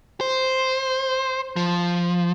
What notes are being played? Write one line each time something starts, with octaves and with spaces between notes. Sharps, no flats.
C5
F3